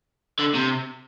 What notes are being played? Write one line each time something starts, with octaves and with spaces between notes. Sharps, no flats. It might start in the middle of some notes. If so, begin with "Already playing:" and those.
D3
C3